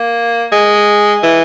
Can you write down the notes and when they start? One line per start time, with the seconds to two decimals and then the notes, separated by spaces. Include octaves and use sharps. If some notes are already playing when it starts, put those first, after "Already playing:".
Already playing: A#3
0.52 G#3
1.23 E3